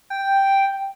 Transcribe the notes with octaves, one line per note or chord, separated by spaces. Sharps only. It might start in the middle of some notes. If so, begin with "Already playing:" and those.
G5